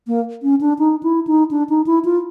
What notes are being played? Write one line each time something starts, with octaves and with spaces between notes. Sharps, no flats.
A#3
C#4
D4
D#4
E4
D#4
D4
D#4
E4
F4